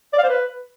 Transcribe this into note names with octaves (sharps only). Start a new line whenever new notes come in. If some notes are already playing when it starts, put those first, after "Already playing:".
D5
F5
C5
B4